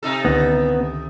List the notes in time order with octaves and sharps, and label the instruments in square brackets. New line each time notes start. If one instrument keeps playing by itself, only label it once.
[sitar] C3 D#4 A4
[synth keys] C#2 D3 D#3 [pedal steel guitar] B3